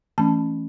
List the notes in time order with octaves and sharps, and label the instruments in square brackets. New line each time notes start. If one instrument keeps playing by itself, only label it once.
[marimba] E3 A3 C#4 A5